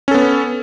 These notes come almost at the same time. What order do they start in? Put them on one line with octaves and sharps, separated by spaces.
C#4 A4 B3